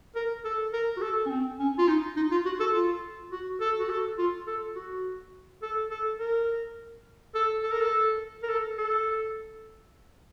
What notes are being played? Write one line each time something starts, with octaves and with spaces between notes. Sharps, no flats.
A#4
A4
A#4
F#4
A4
C#4
C4
C#4
F4
D#4
D#4
F4
F#4
A4
F4
F#4
A4
F#4
A4
F4
A4
F#4
A4
A4
A#4
A4
A4
A#4
A4
A#4
A4
A4